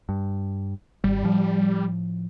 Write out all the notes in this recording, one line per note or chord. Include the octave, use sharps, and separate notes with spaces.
G2
G#1 G3
A2 F3